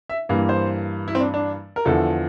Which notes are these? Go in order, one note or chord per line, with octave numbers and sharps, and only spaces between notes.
E5
G2 E3 A#3
C5
E4
C4
D4
D4
A#4
E2 D3 F3 A4